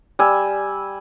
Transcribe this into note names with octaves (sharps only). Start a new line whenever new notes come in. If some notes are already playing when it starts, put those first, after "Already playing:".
G3 G#5 E6